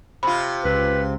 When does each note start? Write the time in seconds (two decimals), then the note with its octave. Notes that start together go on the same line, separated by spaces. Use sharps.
0.23 C3 F4 B5
0.64 C#2 B4